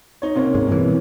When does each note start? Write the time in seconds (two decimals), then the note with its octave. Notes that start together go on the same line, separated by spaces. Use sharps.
0.22 D#4 C#5
0.35 C3 A#3 C#4
0.55 G#2 G#3
0.68 G2 B2 E3